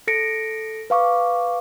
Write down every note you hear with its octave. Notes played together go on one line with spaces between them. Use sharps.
A4 A#6 C#7 D7
B4 F5 C#6 D6